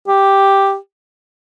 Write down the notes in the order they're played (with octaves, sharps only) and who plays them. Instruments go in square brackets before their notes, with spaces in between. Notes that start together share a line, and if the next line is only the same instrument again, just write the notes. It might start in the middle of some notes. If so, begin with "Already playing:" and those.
[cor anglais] G4